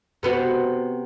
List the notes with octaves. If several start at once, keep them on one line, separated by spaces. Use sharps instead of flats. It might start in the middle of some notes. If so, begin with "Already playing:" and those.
C3 B3 F#4